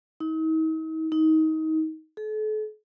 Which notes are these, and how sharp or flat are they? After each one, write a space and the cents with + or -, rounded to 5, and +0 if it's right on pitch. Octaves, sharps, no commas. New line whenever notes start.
D#4 +40
D#4 +25
A4 -40